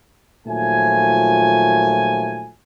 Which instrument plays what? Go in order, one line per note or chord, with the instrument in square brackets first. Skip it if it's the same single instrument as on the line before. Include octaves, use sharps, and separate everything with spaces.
[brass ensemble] D#2 A#2 F3 F#3 A3 G#5